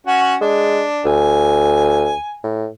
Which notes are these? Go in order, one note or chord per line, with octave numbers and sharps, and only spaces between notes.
C#4 F#4 F#5
G#3 D4
D2 G#5
A2